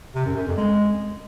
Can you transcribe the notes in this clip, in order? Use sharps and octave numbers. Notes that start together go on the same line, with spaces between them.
C3
F#2
F#2
F2
G#3